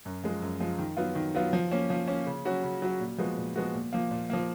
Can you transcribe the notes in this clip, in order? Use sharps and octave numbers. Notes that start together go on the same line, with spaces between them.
F#2
F3 G#3
F#2
F3 G#3
D#3
F#3 B3 F4
D#3
F#3 B3 F4
F3
A#3 C#4
F3
A#3 C#4
C#3
F#3 C#4 F#4
C#3
F#3 C#4 F#4
A#2
F3 G#3 B3 F#4
A#2
F3 G#3 B3 F#4
A#2
F3 A#3
A#2
F3 A#3